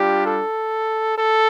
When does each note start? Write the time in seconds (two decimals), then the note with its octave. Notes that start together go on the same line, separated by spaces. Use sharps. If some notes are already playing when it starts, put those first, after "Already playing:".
Already playing: G3 D4 F4 G4
0.25 A4
1.17 A4